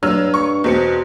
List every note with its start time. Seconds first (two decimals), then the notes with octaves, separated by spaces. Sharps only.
0.03 G2 F#3 E6 F6
0.34 C#6
0.64 E2 B2 C4 C#7